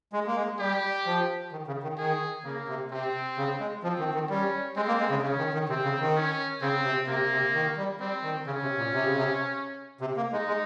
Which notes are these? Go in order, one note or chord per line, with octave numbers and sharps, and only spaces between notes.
G#3
A#3
G#3
G3 G4
F3
D#3
C#3
D#3
D#3 G#4
C#3 A#3
C3
C3 C4
C#3
G#3
F3 C4
D#3
D#3
G3 C#4
G#3 C4
A#3
G#3
C#3
C#3 C#4
D#3
D#3
C3 C4
C#3
D#3
C#4
C#3 C4
C3
C3 A#3
C3
D#3
G3
G3 C4
D#3
C#3 C#4
C3
A#2
C3
C#3
C3
C3
A#3
G#3 D#4
G#3